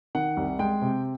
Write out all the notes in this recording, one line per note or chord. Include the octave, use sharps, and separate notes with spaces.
D#3 F#5
C2
G#3 G5
C3